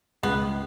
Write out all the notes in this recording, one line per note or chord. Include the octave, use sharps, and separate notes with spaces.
C#2 B3